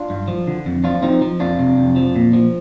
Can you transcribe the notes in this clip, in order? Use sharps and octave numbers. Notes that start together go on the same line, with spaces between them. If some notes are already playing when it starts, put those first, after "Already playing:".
Already playing: D4 F4
G2
F3
D3
F2
F3 D4 F4
F3 C4 D#4
F3
F2 D4 F4
C3
F2
F3
A#2
F3